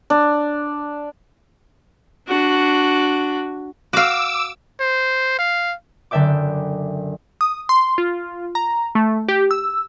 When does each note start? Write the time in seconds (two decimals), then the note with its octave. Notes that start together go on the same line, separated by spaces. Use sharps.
0.10 D4
2.28 D4 F#4
3.93 F#4 F5 D6 E6
4.80 C5
5.38 F5
6.11 F#1 D3 D5 E5 G5 D6
7.41 D#6
7.69 C6
7.98 F4
8.55 A#5
8.95 A3
9.28 G4
9.51 E6